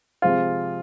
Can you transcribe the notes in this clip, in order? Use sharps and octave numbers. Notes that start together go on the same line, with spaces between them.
C3 F3 G#3 F4